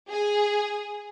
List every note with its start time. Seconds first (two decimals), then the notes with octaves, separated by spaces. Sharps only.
0.10 G#4